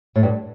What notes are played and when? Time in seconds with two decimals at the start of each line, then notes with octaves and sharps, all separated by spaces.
0.16 A2
0.23 G2